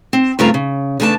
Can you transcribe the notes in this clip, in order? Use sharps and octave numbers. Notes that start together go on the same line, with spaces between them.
C4
G2 C#3 A3 C4 F4 A#5
C#3
E2 C#3 A3 D4 G#4 A5